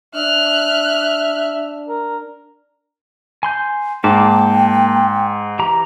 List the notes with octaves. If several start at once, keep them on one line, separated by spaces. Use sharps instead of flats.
D4 E5 F6 F#6
A#4
G#5 C6 G6
G#2 A#3 G5 A5 D6
E3 G4 A#5